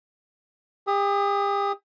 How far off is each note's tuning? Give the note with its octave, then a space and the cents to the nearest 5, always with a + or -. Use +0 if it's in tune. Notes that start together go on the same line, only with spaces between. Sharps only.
G4 +40 D#6 +20